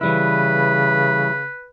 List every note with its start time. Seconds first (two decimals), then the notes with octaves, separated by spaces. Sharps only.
0.01 C#3 E3 G3 E4 B4